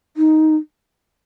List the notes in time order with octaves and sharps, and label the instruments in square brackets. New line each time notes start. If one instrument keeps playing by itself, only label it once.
[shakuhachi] D#4